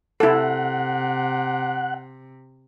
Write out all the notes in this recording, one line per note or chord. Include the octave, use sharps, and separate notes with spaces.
C3 E4 A4 F#5